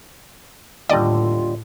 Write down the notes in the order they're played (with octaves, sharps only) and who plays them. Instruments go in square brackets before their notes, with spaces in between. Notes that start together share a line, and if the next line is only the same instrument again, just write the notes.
[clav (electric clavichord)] D#2 D3 G3 [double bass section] A2 [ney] F4 [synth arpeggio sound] D5 D#5